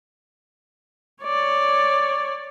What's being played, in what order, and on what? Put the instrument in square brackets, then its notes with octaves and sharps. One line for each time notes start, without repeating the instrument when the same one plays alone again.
[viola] C#5 D5